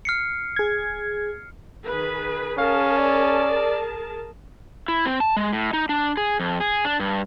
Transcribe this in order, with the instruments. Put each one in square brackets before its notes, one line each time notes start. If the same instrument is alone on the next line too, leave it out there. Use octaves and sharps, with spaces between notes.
[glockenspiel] F6 C7 C#7
[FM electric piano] G#4 G#6
[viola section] D#3 G#4 B4
[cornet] C#4 [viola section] G#4 A#4 A5 [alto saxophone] F5
[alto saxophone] D5
[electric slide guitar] E4
C4
A5
G#3
A2
D#4
D4
G#4
F2
G#4
D4
G2